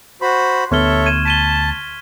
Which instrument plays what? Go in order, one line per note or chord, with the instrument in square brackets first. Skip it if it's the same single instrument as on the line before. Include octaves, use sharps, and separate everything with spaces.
[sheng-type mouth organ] F#4 C5 B5 [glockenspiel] C6
[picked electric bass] D2 B3 [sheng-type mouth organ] A4 C#5 E5 [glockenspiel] C#6 F6 G7
[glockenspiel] G#6 D#7 E7
[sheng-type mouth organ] A5 [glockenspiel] B6 D#7 G7